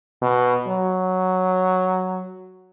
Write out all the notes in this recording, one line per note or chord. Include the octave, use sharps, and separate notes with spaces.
B2
F#3